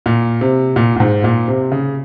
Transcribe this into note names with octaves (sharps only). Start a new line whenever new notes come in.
A#2
C3
A#2
A#2
G#2
A#2
C3
C#3